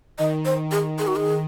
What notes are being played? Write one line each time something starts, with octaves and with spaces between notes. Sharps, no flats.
D#3 D#5
C5
G#4
G#4
F#4
G#4